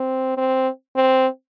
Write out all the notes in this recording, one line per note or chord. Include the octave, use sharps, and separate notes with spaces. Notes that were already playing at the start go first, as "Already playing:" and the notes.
Already playing: C4
C4
C4